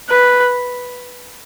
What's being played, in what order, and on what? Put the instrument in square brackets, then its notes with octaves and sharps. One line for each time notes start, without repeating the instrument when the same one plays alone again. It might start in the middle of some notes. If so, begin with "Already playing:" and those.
[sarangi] B4